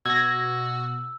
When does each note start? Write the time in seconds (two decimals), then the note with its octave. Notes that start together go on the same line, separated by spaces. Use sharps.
0.06 B2 F#4 E6 G#6 A#6